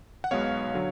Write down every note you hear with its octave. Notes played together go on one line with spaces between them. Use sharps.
F#5
B1 B2 G#3 B3 C#5 F5
D3 F#3